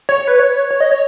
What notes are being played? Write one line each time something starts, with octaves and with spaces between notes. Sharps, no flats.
C#5
B4
C#5
C#5
D#5
C#5